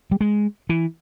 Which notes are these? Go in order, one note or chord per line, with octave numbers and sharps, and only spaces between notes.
G3
G#3
E3